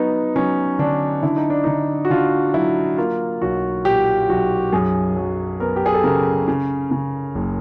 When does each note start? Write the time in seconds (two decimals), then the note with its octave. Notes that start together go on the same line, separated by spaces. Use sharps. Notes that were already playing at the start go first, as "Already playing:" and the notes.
Already playing: F#3 B3 D#4
0.36 F#3 C#4
0.79 D3 D4
1.23 D3 E4
1.37 D#4
1.50 D4
1.64 D3 D#4
2.05 F#4
2.10 D3 F4
2.54 F#3 E4
2.98 A#3 F4
3.42 B1 F#4
3.85 A#2 G4
4.29 B1 F#4
4.73 F#2 G#4
5.16 F#3
5.60 B3 A#4
5.76 G4
5.86 G#4
5.94 A4
6.04 C#3 A#4
6.48 C#3
6.91 C#3
7.35 F#1